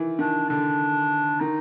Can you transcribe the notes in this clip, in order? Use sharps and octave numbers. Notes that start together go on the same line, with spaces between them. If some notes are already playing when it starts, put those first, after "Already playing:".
Already playing: D#3 E3
D#3 D4
D3 D4
D#3 D#4